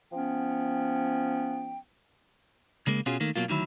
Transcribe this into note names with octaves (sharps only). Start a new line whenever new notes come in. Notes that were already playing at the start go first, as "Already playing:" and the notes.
F3 B3 C#4 G5
C#3 G#3 A#3
B2 C#4 F4 F#4 G#4
D#3 A3 A#3
B2 F#3 A#3 F4
D2 D#3 F#3 E4